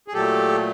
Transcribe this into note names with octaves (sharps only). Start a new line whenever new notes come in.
G#4
A#2 F#3 A3 G4 A4